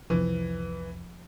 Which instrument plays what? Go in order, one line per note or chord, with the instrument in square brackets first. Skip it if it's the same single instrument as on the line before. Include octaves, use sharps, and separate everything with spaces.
[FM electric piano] C2 F2 [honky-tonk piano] E3 [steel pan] F3